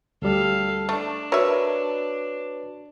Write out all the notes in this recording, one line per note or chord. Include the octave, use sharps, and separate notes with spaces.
D2 G3 A4 F5
A3 D4
F#4 A#4 B4 C#5 E5